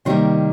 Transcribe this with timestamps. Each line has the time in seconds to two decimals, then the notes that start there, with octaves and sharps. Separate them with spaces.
0.05 C3 D#3 G3 A#3 C5